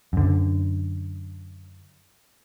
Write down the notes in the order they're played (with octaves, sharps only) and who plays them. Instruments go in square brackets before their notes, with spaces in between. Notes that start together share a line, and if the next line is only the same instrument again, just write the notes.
[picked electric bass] F#2 D3